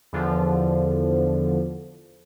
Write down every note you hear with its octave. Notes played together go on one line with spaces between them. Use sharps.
E2 D3 F3